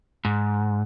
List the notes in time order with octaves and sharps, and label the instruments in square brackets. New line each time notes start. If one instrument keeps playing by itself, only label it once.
[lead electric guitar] G#2